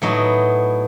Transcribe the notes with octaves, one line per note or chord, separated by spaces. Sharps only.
A2 F#3 B3 D#4